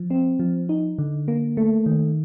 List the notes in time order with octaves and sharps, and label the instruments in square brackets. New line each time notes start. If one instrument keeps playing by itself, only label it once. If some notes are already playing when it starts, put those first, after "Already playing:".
Already playing: [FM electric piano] F3
C4
F3
D#4
D3
A#3
A3
D#3